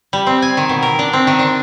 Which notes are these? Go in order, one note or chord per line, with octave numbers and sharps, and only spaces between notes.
G3
C4
G#5
D#3
B2
A#4
D4
C4
D#3
D4